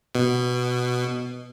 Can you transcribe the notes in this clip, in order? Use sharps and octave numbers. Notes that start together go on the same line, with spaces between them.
B2